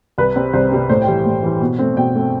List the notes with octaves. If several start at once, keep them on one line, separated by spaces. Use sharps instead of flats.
C2 B4
C3 G3 C4
C2 C5
C3 G3 C4
A2 C5
G5
E3 G3
A2
E3 G3
B2
A3 C4
B2 G5
A3 C4